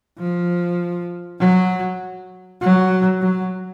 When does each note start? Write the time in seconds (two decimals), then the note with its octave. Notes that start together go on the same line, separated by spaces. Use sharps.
0.19 F3
1.39 F#3
2.62 F#3
3.21 F#3